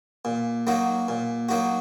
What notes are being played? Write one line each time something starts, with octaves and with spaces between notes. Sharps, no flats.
A#2
F#3 A#3 D#4 F#4
A#2
F#3 A#3 D#4 F#4